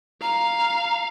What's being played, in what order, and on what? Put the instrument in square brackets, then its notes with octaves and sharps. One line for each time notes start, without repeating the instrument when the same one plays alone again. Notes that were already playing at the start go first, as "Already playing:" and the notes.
[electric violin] F5 [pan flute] A#5